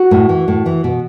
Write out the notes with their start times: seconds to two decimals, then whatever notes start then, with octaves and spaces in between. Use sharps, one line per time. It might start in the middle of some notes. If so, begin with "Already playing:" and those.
Already playing: F#4
0.11 A2
0.29 E3
0.48 A2
0.66 E3
0.84 B2